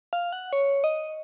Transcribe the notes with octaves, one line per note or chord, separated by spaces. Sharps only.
F5
F#5
C#5
D#5